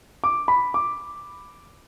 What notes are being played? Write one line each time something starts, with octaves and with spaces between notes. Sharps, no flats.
D6
B5
D6